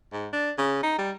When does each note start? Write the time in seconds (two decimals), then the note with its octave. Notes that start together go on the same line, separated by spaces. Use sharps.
0.13 G#2
0.33 D4
0.58 C#3
0.83 D#4
0.98 G3